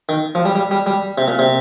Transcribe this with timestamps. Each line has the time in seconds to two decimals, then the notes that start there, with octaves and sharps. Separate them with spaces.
0.09 D#3
0.35 F3
0.45 G3
0.55 G3
0.71 G3
0.86 G3
1.18 C3
1.28 A#2
1.39 C3